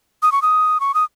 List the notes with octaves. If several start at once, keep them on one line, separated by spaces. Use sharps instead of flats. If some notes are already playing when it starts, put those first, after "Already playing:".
D#6
C#6
D#6
C#6
D#6